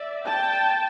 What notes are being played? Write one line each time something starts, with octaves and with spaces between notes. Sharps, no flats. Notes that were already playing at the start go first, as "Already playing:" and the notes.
Already playing: D5 E5
G5 A5